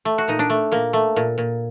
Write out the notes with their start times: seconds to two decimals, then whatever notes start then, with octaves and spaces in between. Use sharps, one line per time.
0.05 A3
0.18 F#4
0.28 A#2 D#4
0.39 D4
0.50 A3
0.72 A#2 A#3
0.93 A3
1.16 A#2
1.38 A#2